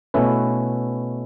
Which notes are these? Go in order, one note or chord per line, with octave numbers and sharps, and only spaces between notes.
B2 A3 C#4 E4 B4